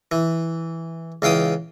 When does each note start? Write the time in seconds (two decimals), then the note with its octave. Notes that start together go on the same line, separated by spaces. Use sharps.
0.11 E3
1.22 C#2 E3 F5 G5 D#6